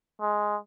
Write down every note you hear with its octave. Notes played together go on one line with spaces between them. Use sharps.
G#3